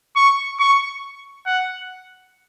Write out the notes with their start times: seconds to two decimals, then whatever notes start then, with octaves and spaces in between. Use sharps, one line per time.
0.16 C#6
0.59 C#6
1.46 F#5